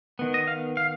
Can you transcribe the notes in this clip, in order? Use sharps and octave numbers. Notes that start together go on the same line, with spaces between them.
D#3 B3
D#5
F5
F5